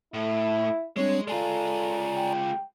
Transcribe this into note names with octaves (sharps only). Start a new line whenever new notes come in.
A2 E4
G3 G#3 C4 D4 C#5
G#3 F4 A4 D5 G#5 A#5
G5